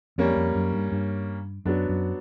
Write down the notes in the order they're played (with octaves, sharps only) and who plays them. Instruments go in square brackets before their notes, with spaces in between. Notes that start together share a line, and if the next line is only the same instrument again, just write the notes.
[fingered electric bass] F2 [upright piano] G3 A#3 C#4
[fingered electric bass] F2
F#2
G2
G2
[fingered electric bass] F#2 [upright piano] F#3 B3 D4
[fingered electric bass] F#2